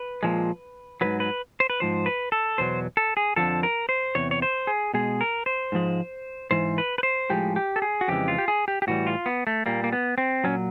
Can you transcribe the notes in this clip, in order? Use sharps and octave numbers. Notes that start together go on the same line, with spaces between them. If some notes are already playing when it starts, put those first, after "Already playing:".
Already playing: B4
A#2 F3 G#3
G#2 D#3 F#3 B4
B4
C5
B4
G#2 F3 C5
B4
A4
E2 B2 F#3 C5
A4
G#4
F2 D3 F3 A4
A#4
C5
E2 C3 C#5
C#5
C5
G#4
B2 G#3 G#4
A#4
C5
G#2 F3 G#3
G#2 E3 C5
B4
B4
C5
A2 F3 G#3 G4
G4
A4
G#4
F#4
F2 C#3 E3 G#3 G4
F4
G4
G#4
G4
G4
A2 E3 G3 F#4
F4
B3
A3
A#2 G3 A#3
A#3
B3
C4
A#2 F#3 C#4